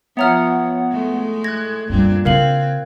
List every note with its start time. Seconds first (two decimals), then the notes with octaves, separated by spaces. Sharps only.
0.17 F3 B3 C#5 E5 F#5 A#5 F6
0.91 A2 G#3 A3
1.44 F#6 G#6 A#6
1.90 F#2 A#2 G3 C4 D4
2.25 C#3 C4 E4 A#4 F5 F#7